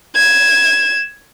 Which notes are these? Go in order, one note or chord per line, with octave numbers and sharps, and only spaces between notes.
G#6 E7